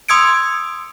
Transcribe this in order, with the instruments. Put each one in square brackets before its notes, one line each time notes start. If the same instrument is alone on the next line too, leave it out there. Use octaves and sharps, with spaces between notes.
[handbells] C6 D#6 E6 G#6 C#7 D7